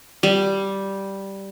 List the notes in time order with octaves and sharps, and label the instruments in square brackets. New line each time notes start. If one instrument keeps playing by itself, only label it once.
[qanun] G3